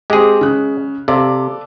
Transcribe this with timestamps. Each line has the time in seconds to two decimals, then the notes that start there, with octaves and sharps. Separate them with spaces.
0.10 G#3 C4 G4 G#4
0.41 C#3 F#6
1.08 C3 A4 D5 F5